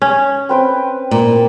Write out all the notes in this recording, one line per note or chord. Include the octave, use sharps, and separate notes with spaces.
C#4
C4 B4 G5
A#2